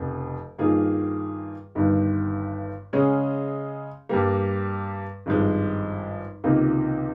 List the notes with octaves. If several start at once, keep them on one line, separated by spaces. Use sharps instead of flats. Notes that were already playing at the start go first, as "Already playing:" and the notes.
Already playing: F1 F2 C#3
G2 D#3 A#3 F4 G#4
G1 G2 D#3
C#3 G#3 C#4 G#4
G2 G3 A#3
G#1 G2 F3 G#3
C#2 C3 D#3 A#3 F4